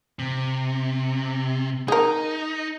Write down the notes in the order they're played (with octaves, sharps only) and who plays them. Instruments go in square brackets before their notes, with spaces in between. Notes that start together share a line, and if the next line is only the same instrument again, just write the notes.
[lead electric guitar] C3
[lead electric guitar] D#4 [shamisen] G#4 A#4